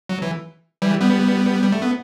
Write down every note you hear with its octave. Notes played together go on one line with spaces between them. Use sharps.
F#3
E3
E3 G3
G3 B3
G3
A3
B3